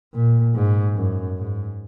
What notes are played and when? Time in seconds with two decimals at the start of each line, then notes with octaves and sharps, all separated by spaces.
0.14 A#2
0.55 G#2
0.96 F#2
1.38 G#2